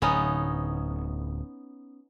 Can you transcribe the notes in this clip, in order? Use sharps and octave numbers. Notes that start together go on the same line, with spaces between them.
D1 B3 C#4 D#4